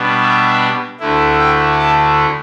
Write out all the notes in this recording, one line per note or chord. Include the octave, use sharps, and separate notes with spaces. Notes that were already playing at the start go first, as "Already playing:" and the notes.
Already playing: B2 G3 B3 D4
E5
D2 D3 A3 E4
G5
A5